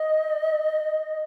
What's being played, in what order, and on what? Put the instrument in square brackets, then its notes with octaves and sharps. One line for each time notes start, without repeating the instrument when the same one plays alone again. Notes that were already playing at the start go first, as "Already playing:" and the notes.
Already playing: [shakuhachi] D#5